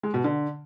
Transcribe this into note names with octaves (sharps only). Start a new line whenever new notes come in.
G#3
B2
D3